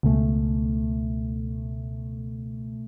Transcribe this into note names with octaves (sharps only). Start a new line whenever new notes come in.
C#2 B2 A3